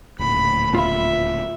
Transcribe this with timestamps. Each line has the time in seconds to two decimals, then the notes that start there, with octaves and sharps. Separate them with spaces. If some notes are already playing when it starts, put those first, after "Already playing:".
0.19 D#1 D2 A2 B5
0.75 F4 E5 F5 B5